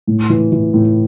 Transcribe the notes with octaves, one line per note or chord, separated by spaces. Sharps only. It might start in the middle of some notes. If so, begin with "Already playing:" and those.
A2
E3
E3
A2